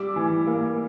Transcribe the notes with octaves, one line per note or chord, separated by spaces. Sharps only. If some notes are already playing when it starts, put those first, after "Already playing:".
Already playing: G3 D6 E6
E3
A#3